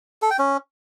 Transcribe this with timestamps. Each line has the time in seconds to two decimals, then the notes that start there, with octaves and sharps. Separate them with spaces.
0.22 A4
0.30 G5
0.39 C#4